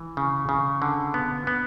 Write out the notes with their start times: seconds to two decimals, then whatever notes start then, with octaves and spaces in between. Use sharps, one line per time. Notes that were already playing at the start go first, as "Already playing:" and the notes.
Already playing: E3
0.17 C#3
0.49 C#3
0.82 D3
1.14 B3
1.47 B3